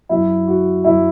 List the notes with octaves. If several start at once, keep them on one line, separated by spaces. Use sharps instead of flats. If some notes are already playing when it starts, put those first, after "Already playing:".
F#2 F#3 E4
F#4
F#2 F#3 E4